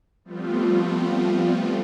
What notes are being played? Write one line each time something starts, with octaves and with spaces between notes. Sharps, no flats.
F3 G3 A3 B3 C4 F4